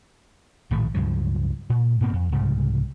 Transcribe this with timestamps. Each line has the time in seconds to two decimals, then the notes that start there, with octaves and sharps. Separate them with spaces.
0.71 A#1 A2 D#3 A3
0.94 C#2 G2 F3 F#3
1.70 A#2
2.01 G#2 B2 A#3 C4
2.13 F2
2.32 C2 G#2 C#3 G3